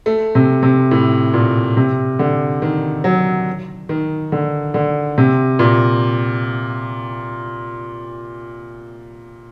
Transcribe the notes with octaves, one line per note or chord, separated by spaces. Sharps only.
A3
C3
C3
A2
A#2
C3
D3
D#3
F#3
D#3
D3
D3
C3
A#2